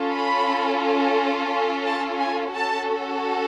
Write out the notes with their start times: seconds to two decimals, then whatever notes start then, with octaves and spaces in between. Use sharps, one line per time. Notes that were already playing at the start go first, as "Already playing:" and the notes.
Already playing: C#4 F4 A4
0.14 B5
1.85 A5
2.19 G#5
2.53 C#4 F#4 A4 A5